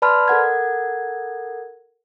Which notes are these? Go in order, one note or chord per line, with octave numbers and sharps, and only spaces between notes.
B4 D5 A5 B5 C6 F6
A4 A#4 F#5 G#6